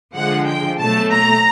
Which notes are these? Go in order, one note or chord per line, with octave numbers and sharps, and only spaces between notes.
D3 F3 G#3 F#5
G5
B2 F#3 A3 A5
A#5